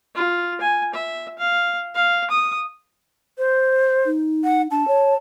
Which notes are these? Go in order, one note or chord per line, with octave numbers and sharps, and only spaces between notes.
F4
G#5
E5
F5
F5
D#6
C5
D#4
F#5
D4 A5
C#5